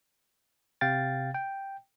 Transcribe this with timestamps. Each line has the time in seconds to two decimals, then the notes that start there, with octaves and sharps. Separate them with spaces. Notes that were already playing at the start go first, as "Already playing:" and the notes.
0.81 C3 F5 G5 A6
1.34 G5